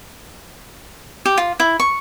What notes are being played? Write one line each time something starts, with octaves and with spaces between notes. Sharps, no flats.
G4
F4
E4
C#6